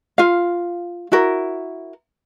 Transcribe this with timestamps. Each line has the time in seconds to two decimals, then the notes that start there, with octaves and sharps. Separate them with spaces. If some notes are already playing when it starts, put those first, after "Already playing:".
0.18 F4 F5
1.12 E4 F#4 A#4